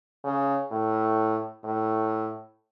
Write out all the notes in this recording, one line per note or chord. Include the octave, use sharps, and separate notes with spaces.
C#3
A2
A2